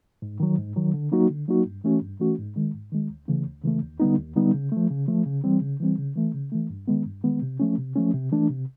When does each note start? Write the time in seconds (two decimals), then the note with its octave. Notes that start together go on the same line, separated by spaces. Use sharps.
0.22 G#2
0.40 D#3 F#3
0.58 G#2
0.76 D#3 F#3
0.94 D3
1.12 F#3 A#3 D#4 F#4
1.30 D3
1.48 F#3 A#3 D#4 F#4
1.66 G2
1.84 E3 A3 C#4 F#4
2.02 G2
2.20 E3 A3 C#4 F#4
2.38 G#2
2.56 D#3 G#3
2.74 G#2
2.92 D#3 G#3
3.10 D2
3.28 C#3 E3 A3
3.46 D2
3.64 C#3 E3 A3
3.82 D#2
4.00 D3 G3 B3 D#4
4.18 D#2
4.36 D3 G3 B3 D#4
4.54 C#3
4.72 F3 A3
4.90 C#3
5.08 F3 A3
5.26 C#3
5.44 E3 G3 C4
5.61 C#3
5.80 E3 G3 C4
5.98 C#3
6.16 E3 A3
6.34 C#3
6.52 E3 A3
6.70 G2
6.88 D#3 G#3 B3
7.06 G2
7.24 D#3 G#3 B3
7.42 C3
7.60 F3 A3 C#4
7.78 C3
7.96 F3 A3 C#4
8.14 C3
8.32 E3 A3 D4
8.50 C3